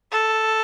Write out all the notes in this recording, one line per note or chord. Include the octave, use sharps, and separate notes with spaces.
A4